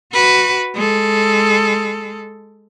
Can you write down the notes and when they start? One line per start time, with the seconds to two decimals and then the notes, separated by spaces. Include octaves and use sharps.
0.13 F#4 B4
0.75 G#3 A4